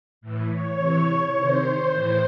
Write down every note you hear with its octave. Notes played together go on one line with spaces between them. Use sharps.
A2 E3
C#5
C3 E3
C3 D#3 C5
A2 E3 C5